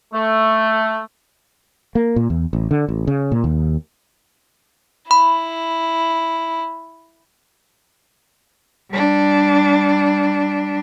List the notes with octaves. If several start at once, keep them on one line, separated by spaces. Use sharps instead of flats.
A3
A#3
A#2
E2
A1
D3
A1
C#3
A#2
D#2
E4 B5
G3 D4